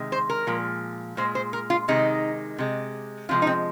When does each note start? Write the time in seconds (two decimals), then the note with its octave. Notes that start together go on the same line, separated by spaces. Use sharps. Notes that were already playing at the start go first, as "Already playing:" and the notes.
Already playing: C3 D#3 G#3
0.12 C5
0.30 A#4
0.47 A#2 F3 G#3
1.17 A#2 G#3 C5
1.35 C5
1.53 A#4
1.70 F4
1.88 C3 D#3 G#3 D#4
2.58 C3 G#3
3.29 C3 F3 G#3 F4
3.42 D#4
3.47 C4